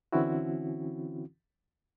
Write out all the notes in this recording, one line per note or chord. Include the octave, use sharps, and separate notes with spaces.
D3 E3 C4 C#4 E4 F#4